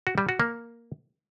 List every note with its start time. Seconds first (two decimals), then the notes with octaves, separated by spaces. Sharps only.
0.07 F#4
0.18 G3
0.29 F#4
0.40 A#3